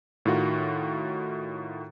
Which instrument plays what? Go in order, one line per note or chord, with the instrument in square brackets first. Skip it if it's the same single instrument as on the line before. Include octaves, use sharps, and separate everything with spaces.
[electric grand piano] A2 D#3 F4 F#4